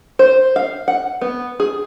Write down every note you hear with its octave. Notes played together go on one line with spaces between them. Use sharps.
C5
F5
F#5
B3
G#4